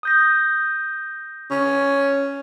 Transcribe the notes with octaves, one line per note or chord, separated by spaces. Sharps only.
D#6 G6 A#6
C#4